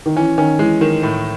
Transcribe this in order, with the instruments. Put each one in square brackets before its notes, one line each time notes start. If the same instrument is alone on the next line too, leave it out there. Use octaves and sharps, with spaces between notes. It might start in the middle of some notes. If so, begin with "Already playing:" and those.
[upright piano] D#3
[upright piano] E3 [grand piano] C#4
[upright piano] D#3 [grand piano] C#4
[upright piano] E3 [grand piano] G#3
[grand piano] D#3
A2